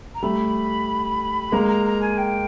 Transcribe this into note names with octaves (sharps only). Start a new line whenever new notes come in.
A#5
G3 A3 B5
G#3 A#3 A#5
A#5
A#5
G#5
G5